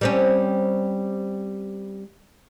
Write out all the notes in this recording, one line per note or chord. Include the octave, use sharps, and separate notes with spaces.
G3 C4 C#4